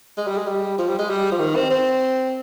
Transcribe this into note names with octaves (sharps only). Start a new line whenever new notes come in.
G#3
G3
G#3
G3
F3
G3
G#3
G3
F3
D#3
C4
C4